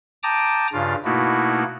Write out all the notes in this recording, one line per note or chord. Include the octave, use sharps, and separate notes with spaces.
G5 A5 A#5 D6 D#6
G2 C#3 F4 A6
B2 A3 A#3 D#4 E4 F#4